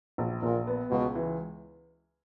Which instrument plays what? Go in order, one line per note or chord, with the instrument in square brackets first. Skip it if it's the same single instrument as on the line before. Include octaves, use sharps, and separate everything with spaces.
[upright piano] A#1
[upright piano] A#1 [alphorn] A#2
[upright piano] B3
[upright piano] C#2 [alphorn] B2
[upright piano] E3